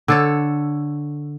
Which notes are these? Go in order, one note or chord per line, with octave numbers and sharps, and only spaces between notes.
D3 A4 C#5